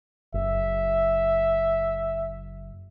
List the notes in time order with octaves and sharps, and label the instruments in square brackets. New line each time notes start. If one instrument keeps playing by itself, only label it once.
[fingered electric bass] F#1 [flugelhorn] E5